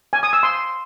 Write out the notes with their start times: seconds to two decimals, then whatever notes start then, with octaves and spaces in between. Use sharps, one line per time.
0.13 G#5
0.23 D#6
0.33 E6
0.43 C6